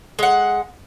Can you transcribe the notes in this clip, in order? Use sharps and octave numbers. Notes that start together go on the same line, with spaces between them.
G#3 F#5